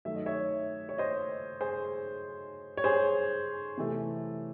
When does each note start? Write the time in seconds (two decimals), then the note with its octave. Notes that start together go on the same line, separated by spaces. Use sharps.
0.05 D#3 F#3 A3 E5
0.16 D#5
0.26 C#5 E5
0.89 C#5
0.98 C5 D#5
1.61 G#4 C5
2.77 C#5
2.84 G#4 C5
3.77 C3 E3 A3